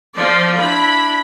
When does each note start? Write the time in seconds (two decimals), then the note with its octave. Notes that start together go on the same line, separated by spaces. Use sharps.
0.15 F3 D5
0.60 D4 E4 B5